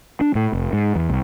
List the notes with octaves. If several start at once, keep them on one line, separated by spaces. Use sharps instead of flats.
D4
A2
F1
G#2
E2
C2